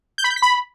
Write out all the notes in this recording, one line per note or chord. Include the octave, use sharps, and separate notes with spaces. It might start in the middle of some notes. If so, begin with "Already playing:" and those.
G6
B5
G6
B6
B5